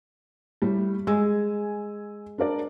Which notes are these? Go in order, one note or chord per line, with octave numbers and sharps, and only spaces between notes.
A2 G3
G#3 G#5 E6
D4 A#4 D5